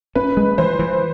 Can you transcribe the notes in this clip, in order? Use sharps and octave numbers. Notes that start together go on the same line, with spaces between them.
C#4 B4
G#3
E3 C5
E3